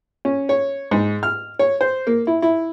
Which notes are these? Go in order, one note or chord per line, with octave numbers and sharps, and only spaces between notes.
C#4
C#5
G#2
F6
C#5
C5
A#3
E4
E4